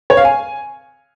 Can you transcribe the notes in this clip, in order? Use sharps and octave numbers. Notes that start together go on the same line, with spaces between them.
C#5
F5
G#5